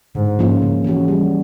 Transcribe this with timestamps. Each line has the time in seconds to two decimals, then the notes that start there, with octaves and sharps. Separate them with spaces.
0.15 G#2 D3
0.39 F3 A#3 C#4 F4
0.62 C#3
0.84 E3 G#3 C#4 F#4
1.08 G3